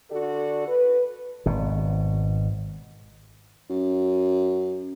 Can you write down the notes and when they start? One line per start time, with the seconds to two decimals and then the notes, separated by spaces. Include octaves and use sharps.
0.11 D3 F#4 A4 D5
0.68 B4
1.46 G#1 B2
3.69 F#2